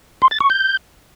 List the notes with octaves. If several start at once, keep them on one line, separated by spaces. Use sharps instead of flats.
C6
A6
C#6
G6